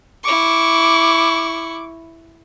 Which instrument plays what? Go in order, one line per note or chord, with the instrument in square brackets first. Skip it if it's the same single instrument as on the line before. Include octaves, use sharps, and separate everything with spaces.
[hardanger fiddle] E4 C#6 [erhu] D6